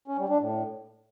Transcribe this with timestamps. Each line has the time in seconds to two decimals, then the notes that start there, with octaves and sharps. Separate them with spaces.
0.08 C#4
0.18 G3
0.29 D4
0.40 A2